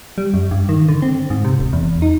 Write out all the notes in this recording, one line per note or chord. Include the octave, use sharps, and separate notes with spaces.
G3
F#2
G2
D#3
D3
C4
G#2
C3
D1
E2
D#4